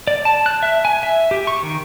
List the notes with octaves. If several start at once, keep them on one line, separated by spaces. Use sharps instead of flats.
D5
A5
F#6
E5
G#5
E5
G4
C#6
D#3